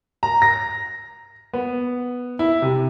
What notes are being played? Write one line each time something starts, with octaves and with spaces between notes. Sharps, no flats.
A#5
A#6
B3
E4
C3